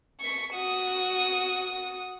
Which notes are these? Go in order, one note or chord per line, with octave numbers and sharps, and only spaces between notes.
C#6 B6
F#4 D#6